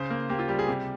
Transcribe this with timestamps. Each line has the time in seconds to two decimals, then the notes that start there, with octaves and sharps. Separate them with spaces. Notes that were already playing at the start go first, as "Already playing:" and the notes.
Already playing: C#3 C5
0.10 A#3
0.29 A#3 G4
0.39 F4
0.48 G3 G4
0.59 G#4
0.68 C3 G4